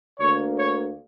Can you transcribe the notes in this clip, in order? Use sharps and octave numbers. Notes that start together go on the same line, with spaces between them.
D2 D3 A#3 C#5
C#5